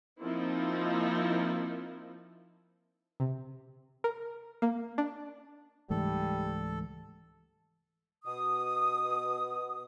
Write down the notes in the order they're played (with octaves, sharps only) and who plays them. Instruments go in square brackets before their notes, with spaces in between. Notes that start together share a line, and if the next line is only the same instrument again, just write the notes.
[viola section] F3 A#3 C4 D#4 E4
[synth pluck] C3
A#4
A#3
D4
[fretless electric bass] C#2 G#2 A3 [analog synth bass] E3 [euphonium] G3 [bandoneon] A4
[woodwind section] B2 D#6